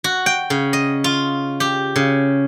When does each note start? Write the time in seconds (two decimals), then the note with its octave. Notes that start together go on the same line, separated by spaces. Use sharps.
0.04 F#4
0.26 G5
0.50 C#3
0.73 D#5
1.04 F4
1.60 G4
1.96 C#3